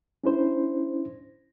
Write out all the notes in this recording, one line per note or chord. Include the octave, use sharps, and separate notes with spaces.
C#4 D4 E4 C5